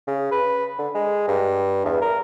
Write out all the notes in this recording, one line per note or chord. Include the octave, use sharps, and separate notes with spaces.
C#3
B4
D3
G#3
G2
E2
A#4